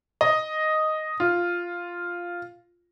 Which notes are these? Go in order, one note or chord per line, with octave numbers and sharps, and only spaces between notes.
D#5
F4